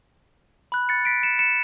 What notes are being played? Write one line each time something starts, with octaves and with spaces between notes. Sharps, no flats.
B5 F#6
A6 C#7
B6 D7
C#7 E7
C#7 E7